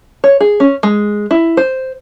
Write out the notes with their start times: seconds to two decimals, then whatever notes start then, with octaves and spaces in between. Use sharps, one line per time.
0.24 C#5
0.40 G#4
0.60 C#4
0.83 G#3
1.31 E4
1.57 C5